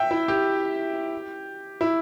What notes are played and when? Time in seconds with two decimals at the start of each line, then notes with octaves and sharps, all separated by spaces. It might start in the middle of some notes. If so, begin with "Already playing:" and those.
Already playing: E5 G5
0.11 E4
0.28 G4
1.81 E4